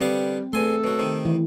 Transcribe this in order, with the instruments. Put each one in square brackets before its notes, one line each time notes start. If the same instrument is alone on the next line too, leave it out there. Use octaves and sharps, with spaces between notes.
[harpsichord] D3 B3 F5 [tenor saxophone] G3 [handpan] C4
[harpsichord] E2 G#5 C6 [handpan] A3 [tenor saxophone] A4
[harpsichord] B2 F#3
C3 D#3
[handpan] E3